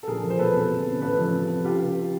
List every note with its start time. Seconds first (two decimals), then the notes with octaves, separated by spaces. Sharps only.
0.03 A4
0.07 A#1 G#4 A#4
0.23 F3
0.30 C5
0.39 E1 A4 B4
0.54 C3
0.70 G1
0.86 C#3
1.01 A1 A4 B4
1.17 F3
1.32 C2
1.49 F3
1.64 C#2 F4 G4
1.80 C#2